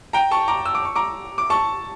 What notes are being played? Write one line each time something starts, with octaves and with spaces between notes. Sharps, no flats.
G5 A#5
A5 C#6
A#5 D6
E6
D6
C#6
A#5 D6
D6
A5 C#6